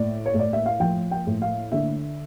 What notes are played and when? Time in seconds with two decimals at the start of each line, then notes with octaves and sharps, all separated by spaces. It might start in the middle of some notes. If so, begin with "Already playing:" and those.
Already playing: A2 D5
0.26 C#5
0.34 A2 D5
0.53 E5
0.66 F5
0.80 F3 G5
1.11 G5
1.27 A2
1.42 F5
1.72 D3 E5